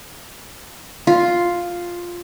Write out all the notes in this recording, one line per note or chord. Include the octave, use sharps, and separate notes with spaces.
F4